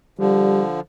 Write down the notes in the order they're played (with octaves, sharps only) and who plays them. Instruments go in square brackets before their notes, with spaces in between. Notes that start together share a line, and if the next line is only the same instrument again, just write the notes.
[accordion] D3 F3 [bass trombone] G3